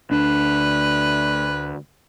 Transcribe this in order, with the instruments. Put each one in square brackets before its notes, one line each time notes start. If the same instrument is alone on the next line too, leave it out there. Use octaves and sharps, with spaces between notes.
[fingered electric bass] D2 D4 [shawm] B4